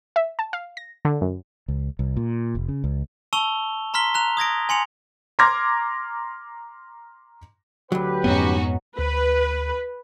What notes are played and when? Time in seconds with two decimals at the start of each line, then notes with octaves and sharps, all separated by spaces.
0.16 E5
0.39 A5
0.53 F5
0.77 A#6
1.05 D3
1.21 F#2
1.68 C#2
1.99 C2
2.17 A#2
2.55 F1
2.69 C#3
2.84 C#2
3.33 A5 C#6 E6 F7 G7
3.94 A#5 C6 F6 B6 G7
4.14 A#5 F#6 F7
4.37 D#6 G#6 A#6 D7
4.69 G#5 C6 C#7 F7
5.39 A#5 C6 D6 F6 G#6 A#6
7.92 D2 F#3 G4 B4
8.24 F2 G#2 B3 C#4 D#4 F#4
8.99 D2 B4